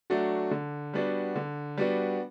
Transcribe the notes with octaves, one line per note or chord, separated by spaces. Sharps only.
F#3 A3 D4 F#4
D3
G3 B3 D4 F#4
D3
G3 B3 D4 F#4